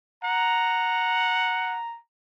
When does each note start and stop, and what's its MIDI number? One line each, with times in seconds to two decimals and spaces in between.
0.24 1.79 78
0.24 1.98 82